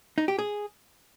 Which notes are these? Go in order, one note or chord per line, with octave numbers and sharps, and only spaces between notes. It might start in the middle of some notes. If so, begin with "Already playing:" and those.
D#4
G4
G#4